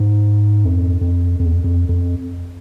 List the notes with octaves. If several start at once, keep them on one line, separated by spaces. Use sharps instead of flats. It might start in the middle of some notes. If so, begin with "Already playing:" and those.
Already playing: G#2
F2
F2
F2
E2
F2
F2
F2